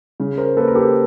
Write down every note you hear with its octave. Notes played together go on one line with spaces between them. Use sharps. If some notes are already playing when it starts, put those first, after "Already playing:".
C#3
A#4 C5
A#3 A4 B4
A#4
G4 A4